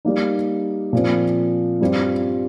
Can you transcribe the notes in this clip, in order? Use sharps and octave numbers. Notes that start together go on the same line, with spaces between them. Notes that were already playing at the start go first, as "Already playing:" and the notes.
G3 A#3 D#4
A#2 F3 C4
G2 G3 C4 F4